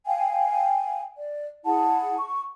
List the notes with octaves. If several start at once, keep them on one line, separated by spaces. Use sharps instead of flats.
F5 G5 G#5
D5
E4 G#4 F#5 A5
C#6